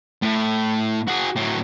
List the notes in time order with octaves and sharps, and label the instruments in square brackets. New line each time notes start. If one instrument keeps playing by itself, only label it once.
[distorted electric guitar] A2 A3
F#4 G#4
A2 F#3